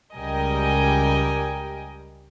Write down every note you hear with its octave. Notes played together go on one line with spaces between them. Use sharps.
C#2 G3 A#4 D#5 G5 G#5